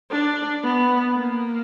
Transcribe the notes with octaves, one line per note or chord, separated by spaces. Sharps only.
D4
B3
A#3